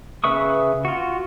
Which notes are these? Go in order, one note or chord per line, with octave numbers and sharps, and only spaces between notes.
C#3 B4 E5 C#6 D#6
F4 F#4